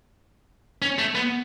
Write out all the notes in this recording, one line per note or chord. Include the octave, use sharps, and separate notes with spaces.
C#4
A3
B3